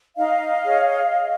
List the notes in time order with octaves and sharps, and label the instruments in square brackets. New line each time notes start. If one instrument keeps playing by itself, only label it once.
[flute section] D#4 D#5 F5
G#4 C#5